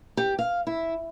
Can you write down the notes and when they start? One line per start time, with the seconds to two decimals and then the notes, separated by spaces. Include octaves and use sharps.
0.17 G4
0.39 F5
0.67 E4